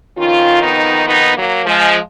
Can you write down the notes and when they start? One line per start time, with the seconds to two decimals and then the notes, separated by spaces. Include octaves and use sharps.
0.17 F2 D#3 C#4 F4
0.62 B3 D#4
1.07 B3 D#4
1.36 F#3 A#3
1.66 F3 G#3